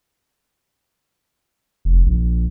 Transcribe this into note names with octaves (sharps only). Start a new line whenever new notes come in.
F1
A#1